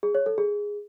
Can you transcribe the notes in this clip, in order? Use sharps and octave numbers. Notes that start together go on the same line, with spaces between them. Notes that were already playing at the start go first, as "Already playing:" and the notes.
G#4
C#5
A4
G#4